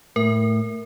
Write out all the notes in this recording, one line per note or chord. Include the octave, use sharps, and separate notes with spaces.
A2 A#4